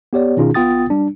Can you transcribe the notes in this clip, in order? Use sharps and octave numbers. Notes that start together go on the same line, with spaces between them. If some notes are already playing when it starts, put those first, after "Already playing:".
B3 G4 C#5 D5
B2 D#3 C#4 D#4 F4 G#4
A1 B3 F4 G5 D#6 A6
G3 D4